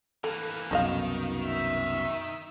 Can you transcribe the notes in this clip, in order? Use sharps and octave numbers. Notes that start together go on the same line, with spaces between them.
E3 A#3 A4
C2 F#2 B2 D#3 D#4 D#5 F5
E5